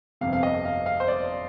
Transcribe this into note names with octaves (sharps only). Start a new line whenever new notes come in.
G1 F2 C3 F5
F5
D#5
F5
F5
C5
D5